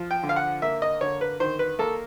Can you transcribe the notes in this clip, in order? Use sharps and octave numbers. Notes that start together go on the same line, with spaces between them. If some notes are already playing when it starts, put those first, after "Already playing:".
Already playing: F3
G5
D3
F5
F#5
A#3 E5
D#5
D3 C#5
B4
D#3 C5
B4
A#3 A4